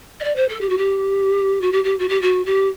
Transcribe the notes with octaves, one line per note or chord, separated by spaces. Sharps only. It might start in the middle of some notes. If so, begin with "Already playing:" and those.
D#5
D5
C5
A4
G4
F#4
G4
F#4
G4
G4
F#4
G4
F#4
G4